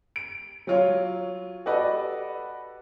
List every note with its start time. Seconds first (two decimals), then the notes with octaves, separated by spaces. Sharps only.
0.16 D7
0.67 F#3 F4 C#5
1.66 F#4 G4 A4 B4 D5 D#5